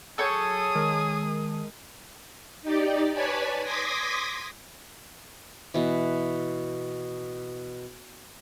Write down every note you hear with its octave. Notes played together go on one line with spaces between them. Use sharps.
F#3 G#4 A4 C#5 D#6 E6 G6
D#3 G#3 A#4 A5
D#4 G4 D5
B4 C#5 D5 G#5 A5 B5
C6 D6 D#6 G#6 A#6 B6
B2 E3